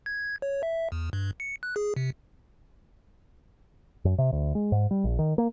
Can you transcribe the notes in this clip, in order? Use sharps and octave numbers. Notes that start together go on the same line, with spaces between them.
G#6
C#5
E5
E2
G2
C#7
F#6
G#4
C3
F#2
C3
D2
G#3
G#2
G3
A#1
D#3
A#3